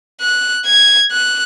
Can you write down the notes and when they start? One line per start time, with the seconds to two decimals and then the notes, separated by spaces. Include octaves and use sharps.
0.21 F#6
0.66 G#6
1.12 F#6